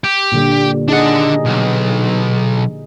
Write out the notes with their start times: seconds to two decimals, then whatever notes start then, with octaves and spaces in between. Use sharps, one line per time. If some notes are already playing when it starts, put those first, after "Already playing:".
0.04 G4
0.32 A#2 D3 G3
0.88 D4 D#4 G#4 D#5 F#5
1.45 B1